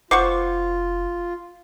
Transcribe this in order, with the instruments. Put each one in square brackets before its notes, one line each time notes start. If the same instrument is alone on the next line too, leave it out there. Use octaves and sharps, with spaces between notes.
[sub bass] F1 [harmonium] F4 [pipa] C5 F#5 C#6 [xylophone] D6